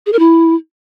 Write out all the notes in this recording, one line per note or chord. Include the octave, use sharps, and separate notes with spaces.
G#4
A#4
E4